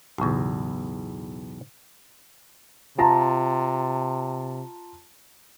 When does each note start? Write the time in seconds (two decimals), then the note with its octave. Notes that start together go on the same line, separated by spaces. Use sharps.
0.18 B1 E2 A2 C#3
2.98 C3 F4 A5 A#5